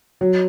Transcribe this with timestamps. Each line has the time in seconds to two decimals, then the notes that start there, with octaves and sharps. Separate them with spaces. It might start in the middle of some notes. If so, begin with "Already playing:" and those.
0.21 F#3